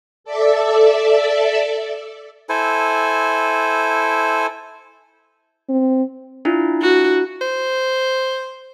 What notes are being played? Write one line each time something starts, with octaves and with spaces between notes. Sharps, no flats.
A4 D5 E5
E4 A4 C5 G#5
C4
D4 E4 F4
F#4
C5